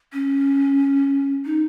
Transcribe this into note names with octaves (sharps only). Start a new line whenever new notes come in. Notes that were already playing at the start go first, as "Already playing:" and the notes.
C#4
D#4